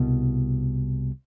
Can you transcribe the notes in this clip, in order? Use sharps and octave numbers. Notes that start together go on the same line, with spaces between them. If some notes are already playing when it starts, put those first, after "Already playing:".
Already playing: C2 B2